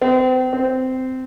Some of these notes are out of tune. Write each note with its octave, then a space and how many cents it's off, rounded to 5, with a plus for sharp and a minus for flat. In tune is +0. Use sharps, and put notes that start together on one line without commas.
C4 -35
C4 -15